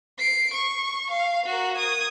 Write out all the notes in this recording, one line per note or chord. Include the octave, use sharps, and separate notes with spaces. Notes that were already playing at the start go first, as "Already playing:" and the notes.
C7 D7
C#6
F5
F#4 A#4
D#6 G#6